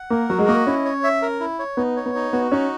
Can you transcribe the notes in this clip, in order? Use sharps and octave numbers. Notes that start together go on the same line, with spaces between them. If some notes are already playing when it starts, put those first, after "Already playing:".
Already playing: F#5
A#3 A#4
F#3 F#4
G#3
A#3 D#5
C#4 E4
C#5
E5
A#4
E4
C#5
B3 D#4
C#5
B3
D#4
B3 F#4
C#4 D#4